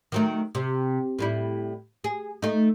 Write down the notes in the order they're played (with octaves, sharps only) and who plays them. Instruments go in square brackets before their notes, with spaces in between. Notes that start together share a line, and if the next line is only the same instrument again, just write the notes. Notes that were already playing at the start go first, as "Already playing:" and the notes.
[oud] D#3 F#3 A3
C3
A2 G3 E4
G#4
A3 D#4